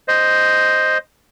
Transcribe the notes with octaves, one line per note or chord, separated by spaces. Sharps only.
C5 D#5